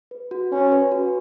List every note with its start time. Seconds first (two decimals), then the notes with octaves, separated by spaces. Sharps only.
0.11 B4
0.31 F#4
0.52 C#4 G#5
0.72 B4
0.92 F#4